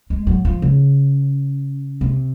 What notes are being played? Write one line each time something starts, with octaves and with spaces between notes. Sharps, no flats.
G#3
F#3
F3
C#3
C3